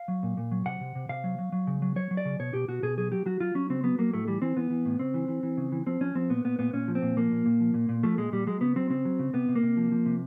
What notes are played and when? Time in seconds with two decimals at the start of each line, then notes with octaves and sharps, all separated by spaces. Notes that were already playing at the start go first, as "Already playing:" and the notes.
Already playing: F5
0.08 F#3
0.23 A#2
0.37 A#2
0.52 F#3
0.66 C3 F#5
0.80 C3
0.95 C3
1.09 C3 F5
1.24 F#3
1.38 F#3
1.52 F#3
1.67 C#3
1.82 F#3
1.96 F#3 C#5
2.11 F#3
2.17 D5
2.25 C#3
2.39 B2 C#5
2.53 B2 G4
2.68 B2 F#4
2.83 B2 G#4
2.98 F#3 G#4
3.12 F#3 G4
3.26 F#3 F#4
3.40 F#3 F4
3.55 F#3 C#4
3.70 C#3 C4
3.84 F#3 B3
3.99 F#3 A#3
4.13 A2 A3
4.27 E3 G3
4.42 E3 C4
4.57 E3 B3
4.70 E3
4.85 A2
4.99 C#3 C4
5.14 E3
5.28 E3
5.43 E3
5.57 C#3
5.72 E3
5.86 F3 C4
6.01 F3 C#4
6.15 F3 C4
6.30 A#2 B3
6.44 A#2 B3
6.59 A#2 B3
6.73 A#2 C#4
6.88 F3
6.95 C4
7.02 A#2
7.17 F3 A#3
7.31 A#2
7.46 A#2
7.60 F3
7.74 A#2
7.89 A#2
8.03 F3 A3
8.18 A#2 G#3
8.32 A#2 G3
8.47 F#3 G#3
8.61 C#3 B3
8.76 F#3 C4
8.90 C#3 C4
9.05 F#3
9.19 C#3
9.33 C3 B3
9.49 C3
9.55 A#3
9.63 C3
9.77 F3
9.92 F3
10.06 C3